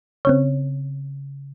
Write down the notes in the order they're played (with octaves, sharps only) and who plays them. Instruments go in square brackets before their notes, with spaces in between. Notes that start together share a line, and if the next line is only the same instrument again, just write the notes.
[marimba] C#3 [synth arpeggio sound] C4 C#4 C#5